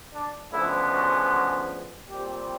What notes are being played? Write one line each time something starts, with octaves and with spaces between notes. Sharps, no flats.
D4
D2 C#3 F3 G#3 B3 E4
F#4
F#4
A#2 G3 C4 G4